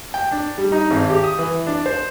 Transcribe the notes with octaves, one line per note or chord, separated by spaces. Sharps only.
G5
D4
G3
D#4
G#1
G4
D#6
E3
D4
C5